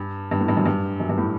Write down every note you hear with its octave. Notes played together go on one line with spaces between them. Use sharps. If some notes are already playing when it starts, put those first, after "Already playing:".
Already playing: G2
G2
A2
G2
F#2
G2
F#2
G2
A2